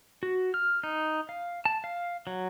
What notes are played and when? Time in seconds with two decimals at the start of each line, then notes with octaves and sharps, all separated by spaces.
0.23 F#4
0.54 F6
0.83 D#4
1.29 F5
1.65 A5
1.84 F5
2.27 F#3